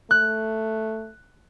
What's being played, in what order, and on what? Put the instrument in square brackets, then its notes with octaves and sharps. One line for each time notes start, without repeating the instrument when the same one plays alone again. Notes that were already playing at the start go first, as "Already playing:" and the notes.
[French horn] A3 [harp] F#6